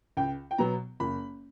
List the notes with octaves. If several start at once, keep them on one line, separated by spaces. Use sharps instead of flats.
C#2 G5
G5
B2 F#3 B3 A#5
F#1 B5